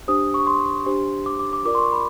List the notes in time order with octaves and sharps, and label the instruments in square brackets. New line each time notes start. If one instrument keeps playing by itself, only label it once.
[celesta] D4 G4 C5 D#6
C#6
C6
D4 G4 C5
D6
D6
D6
F4 A#4 D5 D6
C6
C#6
B5